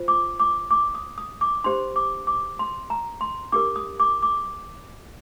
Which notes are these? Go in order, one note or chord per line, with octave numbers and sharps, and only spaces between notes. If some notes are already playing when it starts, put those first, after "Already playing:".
Already playing: F4 C5
D6
D6
D6
D#6
D#6
D6
D4 G4 C5 C6
D6
D6
C6
A#5
C6
D4 G4 A#4 D6
D#6
D6
D6